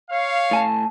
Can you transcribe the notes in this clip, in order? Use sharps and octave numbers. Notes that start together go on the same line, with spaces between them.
C#5 F5
A2 G#5 A5